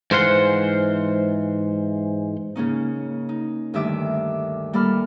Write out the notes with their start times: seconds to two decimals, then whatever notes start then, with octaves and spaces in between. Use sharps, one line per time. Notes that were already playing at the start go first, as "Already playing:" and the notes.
0.11 G#2 E3 C5 F5 F#5 C6
2.56 C#3 A#3 C#4 D#4
3.29 D#4
3.74 D2 G2 D#3 D#4 E5 D6
4.73 G3 A#3 A4 B5 F6